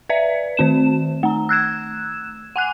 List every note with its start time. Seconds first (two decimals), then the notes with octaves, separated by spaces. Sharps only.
0.09 B4 D5 E5
0.57 D#3 C4 E7
1.23 A3 A#5
1.49 E6 F#6 G#6 E7
2.56 F#5 G#5 F#6